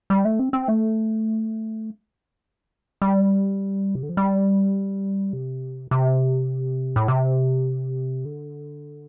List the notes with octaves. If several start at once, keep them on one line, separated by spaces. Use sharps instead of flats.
G3
A3
C4
C4
A3
G3
C3
D3
F3
G3
C3
C3
A2
C3
D3